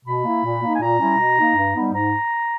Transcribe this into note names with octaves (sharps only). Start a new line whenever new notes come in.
B2 B5
A#3 E4
A#2
A#3 D#4
G#5
A#2 A#5
G3 C#4 E4
B2
A#3 D#4
G2
G3 B3 D#4
G#2 A#5